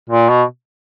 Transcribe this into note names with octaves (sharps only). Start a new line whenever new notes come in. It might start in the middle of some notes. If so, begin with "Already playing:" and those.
A#2
B2